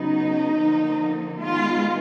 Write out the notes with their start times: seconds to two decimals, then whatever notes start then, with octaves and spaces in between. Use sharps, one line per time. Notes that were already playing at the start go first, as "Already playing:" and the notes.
Already playing: C#3 F#3 B3 D#4
0.54 D3 F3 A#3
1.37 D#3 G#3 B3 F4